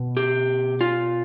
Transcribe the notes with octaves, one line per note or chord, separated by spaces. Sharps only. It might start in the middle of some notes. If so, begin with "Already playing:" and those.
Already playing: B2
G4
F4